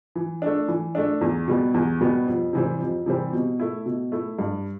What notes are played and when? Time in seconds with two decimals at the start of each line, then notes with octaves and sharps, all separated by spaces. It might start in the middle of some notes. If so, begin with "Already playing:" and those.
0.15 E3
0.42 A3 D4
0.68 E3
0.95 A3 D4
1.21 E2
1.48 B2 G3 B3
1.74 E2
2.01 B2 G3 B3
2.27 F2
2.53 C3 E3 G3 C4
2.80 F2
3.06 C3 E3 G3 C4
3.33 B2
3.60 A3 E4
3.86 B2
4.12 A3 E4
4.39 G2